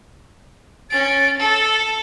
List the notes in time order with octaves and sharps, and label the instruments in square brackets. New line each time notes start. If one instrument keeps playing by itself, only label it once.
[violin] C#4 D7 [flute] A6
[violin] A4